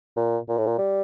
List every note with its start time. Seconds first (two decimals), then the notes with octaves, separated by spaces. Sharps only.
0.17 A#2
0.49 A#2
0.58 A2
0.67 A#2
0.78 G3